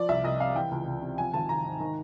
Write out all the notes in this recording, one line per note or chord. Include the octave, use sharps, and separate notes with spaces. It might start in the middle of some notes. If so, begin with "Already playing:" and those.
Already playing: F3 D5
C2 E5
C2 D#5
C3 F5
E3 G5
C#2
C#2
C3
F3 G#5
G#1 A5
G#1 A#5
G#2
D#3